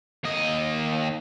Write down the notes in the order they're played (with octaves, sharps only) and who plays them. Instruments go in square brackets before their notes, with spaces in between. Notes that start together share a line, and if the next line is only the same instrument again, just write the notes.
[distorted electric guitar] D#2 D#5